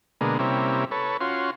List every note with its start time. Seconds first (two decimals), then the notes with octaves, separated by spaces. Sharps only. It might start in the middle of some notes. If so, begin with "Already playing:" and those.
0.21 B2 D3 G#3 A#3
0.39 C3 G3 A#3 C#4 E4
0.91 A4 B4 C#5
1.21 C#4 F4 F#4 C6